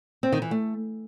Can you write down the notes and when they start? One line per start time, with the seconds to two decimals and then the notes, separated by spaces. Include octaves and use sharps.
0.23 C4
0.32 D#3
0.42 E3
0.51 A3